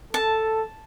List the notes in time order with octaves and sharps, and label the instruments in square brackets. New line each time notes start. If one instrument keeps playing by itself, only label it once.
[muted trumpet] A4 [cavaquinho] A5